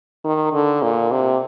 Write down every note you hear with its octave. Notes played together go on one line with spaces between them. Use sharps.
D#3
D3
A#2
C3